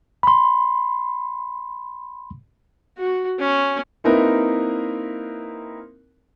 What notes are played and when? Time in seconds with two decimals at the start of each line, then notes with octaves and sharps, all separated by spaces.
0.23 B5 C6
2.98 F#4
3.39 C#4
4.04 A#3 C4 D#4 E4 A#4 B4